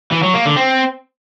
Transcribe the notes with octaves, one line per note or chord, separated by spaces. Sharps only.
E3
F#3
A#3
D3
C4